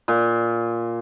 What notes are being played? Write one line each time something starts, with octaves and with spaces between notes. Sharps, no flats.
A#2